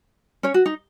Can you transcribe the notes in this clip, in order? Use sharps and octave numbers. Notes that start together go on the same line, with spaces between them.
C#4 C#5
F#4
D#4